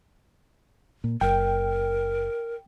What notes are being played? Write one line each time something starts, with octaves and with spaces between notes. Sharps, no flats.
A#2
F#1 A#4 G5